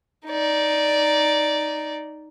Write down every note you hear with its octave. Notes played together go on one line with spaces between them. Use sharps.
D#4 D5